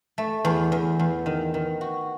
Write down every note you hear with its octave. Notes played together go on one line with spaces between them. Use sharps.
A3
E2
E2
E2
D#3
D#3
F#4